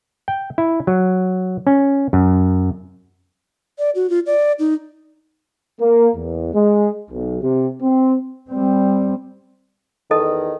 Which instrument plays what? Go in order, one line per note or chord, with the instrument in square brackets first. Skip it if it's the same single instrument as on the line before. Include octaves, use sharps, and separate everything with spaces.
[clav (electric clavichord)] G5
E4
F#3
C#4
F#2
[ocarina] D5
F#4
F4
D5
D#4
[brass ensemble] A#3
E2
G#3
B1
C3
C4
[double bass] G3 C4
[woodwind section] E2 D#3 [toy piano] A4 D#5 A5